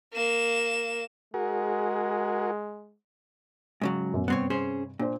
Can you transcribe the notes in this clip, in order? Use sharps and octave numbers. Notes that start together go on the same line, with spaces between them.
A#3 E7
G#3 F#4 G#4 A#4
G#2 C#3 F#3
D#1 F#2 B3
G2 C3 B3 C4 C#5
C#4 G#4 C5
A#2 D4 C5